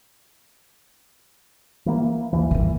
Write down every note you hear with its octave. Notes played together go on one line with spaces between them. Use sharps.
E3 A#3
D#2 E3
D#3 A#3